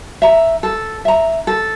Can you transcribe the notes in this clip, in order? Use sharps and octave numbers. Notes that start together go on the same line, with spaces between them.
E5 A#5
A4
E5 A#5
A4